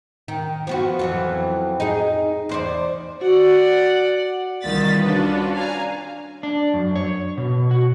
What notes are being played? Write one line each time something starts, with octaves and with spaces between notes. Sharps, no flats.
D#3
F3 B3 F#4
F2 E3 F#3
D#4 G#4
E2 C5 D5
F#4 D5 F#5
C2 D#3 E3 F4 A6 B6
C#4 D4 F4 F#4 B4
F5 G#5 A#5
D4
F#2
C#5
B2
F#4